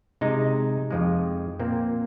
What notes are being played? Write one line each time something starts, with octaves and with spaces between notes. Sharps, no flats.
C3 G#3 D#4
F2 F3 G#3
A#2 A#3 C4